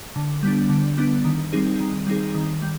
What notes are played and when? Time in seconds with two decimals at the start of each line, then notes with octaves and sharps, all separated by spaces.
0.16 D3
0.43 G3 B3 D4
0.69 D3
0.97 G3 B3 D4
1.24 D#3
1.52 G3 C4 D#4 G#4
1.80 D#3
2.07 G3 C4 D#4 G#4
2.34 D#3
2.62 G3